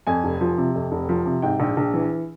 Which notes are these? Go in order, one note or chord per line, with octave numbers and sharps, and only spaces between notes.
F2 G#5
F1
F3
C3
F2
F1
F3
C3
G#2 G5
A#1
A#1
E3